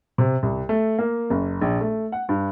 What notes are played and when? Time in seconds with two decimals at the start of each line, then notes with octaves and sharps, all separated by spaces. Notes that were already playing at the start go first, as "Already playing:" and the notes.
0.18 C3
0.43 C2
0.69 A3
0.99 A#3
1.30 F#1
1.61 A#1
1.81 A3
2.12 F#5
2.29 G2